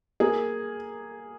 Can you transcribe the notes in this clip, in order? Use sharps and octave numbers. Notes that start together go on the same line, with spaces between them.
A#3 G#4